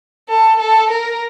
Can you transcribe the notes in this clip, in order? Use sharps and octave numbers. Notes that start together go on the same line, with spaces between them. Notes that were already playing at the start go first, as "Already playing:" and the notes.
A4
A4
A#4